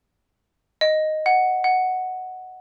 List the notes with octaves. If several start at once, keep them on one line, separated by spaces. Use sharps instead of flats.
D#5
F#5
F#5